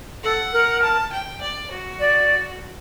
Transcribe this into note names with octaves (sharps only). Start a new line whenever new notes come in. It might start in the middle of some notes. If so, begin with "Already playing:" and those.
A4 F#5
A#4
A5
G5
D5
F#4
D5